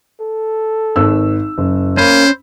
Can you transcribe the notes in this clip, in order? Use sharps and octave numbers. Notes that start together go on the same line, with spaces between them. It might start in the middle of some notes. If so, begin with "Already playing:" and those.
A4
G#1 E6
F#1
A#3 C#4 C5 B5